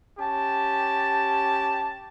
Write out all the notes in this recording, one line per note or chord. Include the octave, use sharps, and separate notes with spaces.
C#4 G4 A5